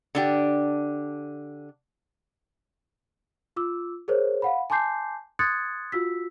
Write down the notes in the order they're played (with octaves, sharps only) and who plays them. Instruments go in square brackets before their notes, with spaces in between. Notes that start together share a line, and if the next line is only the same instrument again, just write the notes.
[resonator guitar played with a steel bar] D3 D4 G4
[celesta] F4 D6 E6
G#4 A#4 C5 C#5
F5 F#5 B5
G#5 A5 C6 D6 G6 C7
C6 D#6 F#6 G#6 A6 C#7
F4 F#4 E6 B6